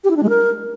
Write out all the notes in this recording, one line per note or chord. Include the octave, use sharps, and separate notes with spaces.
G4
E4
D4
G#3
A#4